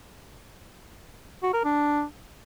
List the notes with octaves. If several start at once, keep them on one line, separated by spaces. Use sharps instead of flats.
F#4
A#4
D4